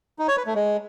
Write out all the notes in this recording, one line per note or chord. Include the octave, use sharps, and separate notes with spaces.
D#4
C#5
B4
A3
G#3